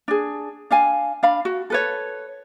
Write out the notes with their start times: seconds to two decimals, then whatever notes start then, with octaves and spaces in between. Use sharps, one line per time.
0.08 D4 G#4
0.71 D4 F5 G#5
1.23 D4 F5 B5
1.45 F#4
1.70 A4 B4 C#5